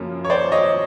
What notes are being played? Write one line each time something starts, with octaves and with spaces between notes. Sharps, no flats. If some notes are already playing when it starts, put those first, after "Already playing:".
Already playing: F#2 C#3 F3 A#3 C#4
C#5
C5 D5
C#5 D#5